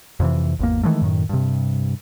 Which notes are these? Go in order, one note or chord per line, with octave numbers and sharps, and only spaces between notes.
F2 C3 E3
G#1 E2 A#3
D#3 E3 G#3 A3
F#2 A2 D#3
G2 C3